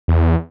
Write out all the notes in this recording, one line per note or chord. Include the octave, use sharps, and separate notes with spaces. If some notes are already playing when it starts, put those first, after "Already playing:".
E2